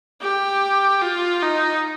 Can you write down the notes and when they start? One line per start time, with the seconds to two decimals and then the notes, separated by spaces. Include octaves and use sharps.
0.21 G4
1.01 F4
1.42 D#4